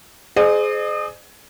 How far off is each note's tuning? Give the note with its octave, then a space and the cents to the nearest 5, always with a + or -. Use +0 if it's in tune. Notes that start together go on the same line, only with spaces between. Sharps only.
G#4 +20 C5 -20 D#5 -45